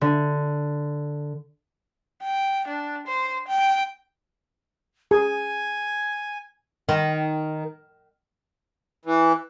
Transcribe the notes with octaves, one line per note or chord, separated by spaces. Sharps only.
D3
G5
D4
C5
G5
G#4 G#5
D#3
E3